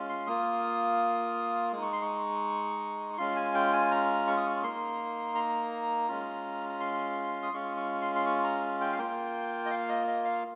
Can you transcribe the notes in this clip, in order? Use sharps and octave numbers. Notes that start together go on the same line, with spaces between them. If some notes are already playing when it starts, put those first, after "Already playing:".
Already playing: G#3 C#4 F4
C6
A#3 F4 D#6
G#3 D#4 D#6
C#6
C6
C#6
C#6
G#3 C#4 F4 C6
G#5
G5
G#5
A#5
C#6
D#6
C#6
A#3 D#4 C6
A#5
G#3 C#4 F4
A#5
C6
D#6
G#3 C#4 F4 C#6
C#6
C6
C6
C#6
A#5
G5
F5
A#3 F4 G5
D#5
F5
D#5
D#5
F5